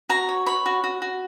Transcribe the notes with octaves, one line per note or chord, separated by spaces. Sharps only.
F#4 A#5
C#5
C#5 B5
F#4
F#4
F#4